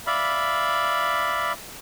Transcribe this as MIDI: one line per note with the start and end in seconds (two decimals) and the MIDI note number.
0.07 1.53 74
0.07 1.53 76
0.07 1.53 77
0.07 1.53 83